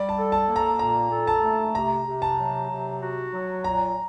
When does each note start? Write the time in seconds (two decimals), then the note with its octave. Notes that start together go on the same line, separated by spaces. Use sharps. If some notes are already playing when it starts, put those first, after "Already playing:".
Already playing: G3 D5
0.09 A5
0.16 A4
0.32 A5
0.48 A#3
0.56 A#5
0.79 A#2 A#5
1.11 A4
1.27 A5
1.43 A3
1.74 C3 A#5
2.06 C3
2.22 A5
2.38 F#3
2.69 C3
3.01 F#4
3.33 F#3
3.64 A#2 A#5